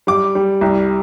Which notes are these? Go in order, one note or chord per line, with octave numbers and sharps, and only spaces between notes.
G3 D6
G3
C2